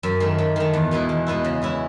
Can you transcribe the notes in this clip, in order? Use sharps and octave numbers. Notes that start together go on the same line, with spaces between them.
F#2
D#3 A3
F#2
D#3 A3
E2
B2 G#3 B3 E4
E2
B2 G#3 B3 E4
C#3
G#3 C#4 E4